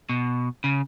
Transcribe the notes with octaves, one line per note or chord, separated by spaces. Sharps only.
B2
C#3